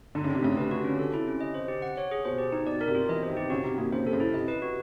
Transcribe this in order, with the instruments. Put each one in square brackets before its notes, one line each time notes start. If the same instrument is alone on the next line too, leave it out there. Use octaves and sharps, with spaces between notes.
[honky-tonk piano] D3 [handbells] D#4
[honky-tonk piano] C#3
[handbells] C4
[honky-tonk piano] C3
[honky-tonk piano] C#3 [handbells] A3
[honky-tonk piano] C3 [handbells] B4
[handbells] F#4
C#4
A4
E4
C#4
D#5
C5
G4
F#5
C#5
G#4
[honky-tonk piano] B2 [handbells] C5
[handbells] G4
D#4
[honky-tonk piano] B2 [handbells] D5
[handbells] A#4
[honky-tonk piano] C3
[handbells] F4
[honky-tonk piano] E3 [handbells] D#5
[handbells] C5
[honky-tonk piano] D#3
[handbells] G4
[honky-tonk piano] C#3 [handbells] F#4
[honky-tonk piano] C3 [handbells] D#4
[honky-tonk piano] C3 [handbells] A#3
[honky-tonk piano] C#3 [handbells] C5
[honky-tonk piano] C3 [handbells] A4
[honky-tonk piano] C#3
[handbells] E4
[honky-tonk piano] C3 [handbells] D#5
[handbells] B4
F#4